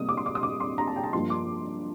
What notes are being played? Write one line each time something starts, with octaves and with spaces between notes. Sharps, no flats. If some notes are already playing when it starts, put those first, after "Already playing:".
Already playing: C3 G3 A#3 D#6
D6
C6
D6
D#6
D6
C6
A#5
A5
G5
A5
G2 F3 A#3 C6
D6